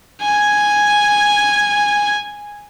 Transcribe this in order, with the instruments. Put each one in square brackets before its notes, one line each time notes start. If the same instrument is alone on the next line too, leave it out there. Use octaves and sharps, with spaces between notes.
[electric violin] G#5 G#6